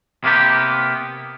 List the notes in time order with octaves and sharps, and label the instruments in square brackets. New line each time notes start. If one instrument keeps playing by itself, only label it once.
[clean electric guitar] C3 A#3 B3 G4